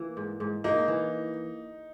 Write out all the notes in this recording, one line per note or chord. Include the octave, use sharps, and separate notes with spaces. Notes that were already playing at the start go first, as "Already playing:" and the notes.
Already playing: E3 A#3
G#2
G#2
A#3 D#4
E3